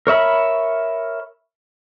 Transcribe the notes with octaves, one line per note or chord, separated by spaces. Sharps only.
A#4 C#5 E5 B5